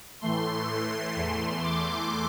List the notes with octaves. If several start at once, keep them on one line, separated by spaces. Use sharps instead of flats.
A2 E3 A3 C6
E2 E3 A3
D6